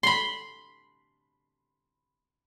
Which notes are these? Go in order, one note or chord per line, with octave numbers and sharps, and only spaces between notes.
B5 C6